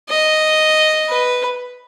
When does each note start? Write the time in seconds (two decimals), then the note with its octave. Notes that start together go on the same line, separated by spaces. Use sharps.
0.10 D#5
1.09 B4